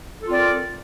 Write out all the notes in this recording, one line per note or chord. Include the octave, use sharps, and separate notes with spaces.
C4 F4 A4 A#4 D5